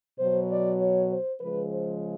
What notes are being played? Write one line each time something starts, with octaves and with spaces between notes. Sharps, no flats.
B2 F#3 C5
D5
C#5
C5
C#3 F3 G#3 B4
C5